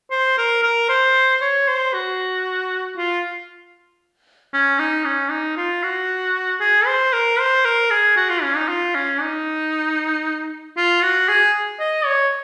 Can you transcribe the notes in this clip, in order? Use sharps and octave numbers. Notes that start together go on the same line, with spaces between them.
C5
A#4
A#4
C5
C#5
C5
F#4
F4
C#4
D#4
C#4
D#4
F4
F#4
G#4
C5
A#4
C5
A#4
G#4
F#4
F4
C#4
D#4
F4
C#4
D#4
F4
F#4
G#4
D#5
C#5